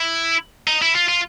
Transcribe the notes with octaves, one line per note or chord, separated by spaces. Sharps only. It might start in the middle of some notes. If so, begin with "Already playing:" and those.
Already playing: E4
D#4
E4
F4
F4